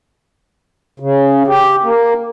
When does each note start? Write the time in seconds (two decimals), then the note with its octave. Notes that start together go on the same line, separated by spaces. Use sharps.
1.00 C#3
1.47 G4
1.83 A#3